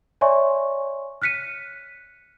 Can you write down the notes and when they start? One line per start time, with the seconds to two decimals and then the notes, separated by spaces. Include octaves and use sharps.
0.21 C#5 D5 E5 G#5 C6 C#6
1.22 F6 F#6 B6 C#7 D#7